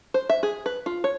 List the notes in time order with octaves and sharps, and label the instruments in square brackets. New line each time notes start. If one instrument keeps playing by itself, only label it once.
[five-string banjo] C5
E5
G#4
B4
F4
C#5